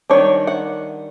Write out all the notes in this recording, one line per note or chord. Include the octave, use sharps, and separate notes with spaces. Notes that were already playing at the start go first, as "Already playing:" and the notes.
D#3 G3 A#3 D4 C#5
F#5